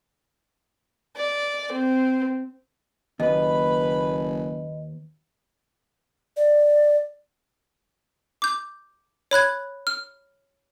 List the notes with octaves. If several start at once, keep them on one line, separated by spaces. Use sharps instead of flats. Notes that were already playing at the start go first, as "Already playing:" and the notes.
D5
C4
F#1 D#2 B4 D#5 B5
D5
D6 G6
C#5 B5 F#6 G#6
F6